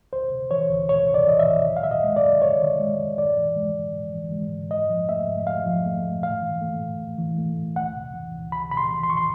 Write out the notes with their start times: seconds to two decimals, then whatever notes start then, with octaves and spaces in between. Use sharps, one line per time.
0.12 D2 C5
0.32 C3
0.51 E3 C#5
0.70 D2
0.89 D2 C#5
1.08 C3
1.14 D5
1.27 E3 D#5
1.39 E5
1.47 D2
1.66 F#2
1.77 F5
1.83 D#3 E5
1.91 D#5
2.04 G#3
2.16 D5
2.23 F#2
2.41 F#2 C#5
2.61 D#3
2.80 G#3
2.99 F#2
3.18 G#2 D5
3.37 E3
3.56 G#3
3.75 G#2
3.94 G#2
4.14 E3
4.32 G#3
4.51 G#2
4.71 G#2 D#5
4.90 F3
5.09 A3 E5
5.28 G#2
5.47 G#2 F5
5.66 F3
5.86 A3
6.04 G#2
6.23 A2 F5
6.42 E3
6.61 A3
6.80 A2
7.00 A2
7.18 E3
7.38 A3
7.57 A2
7.76 C#2 F#5
7.95 C3
8.14 E3
8.34 C#2
8.52 C#2 B5
8.71 C3 B5
8.77 C6
8.91 E3
9.03 C6
9.09 C#2 C#6
9.17 C6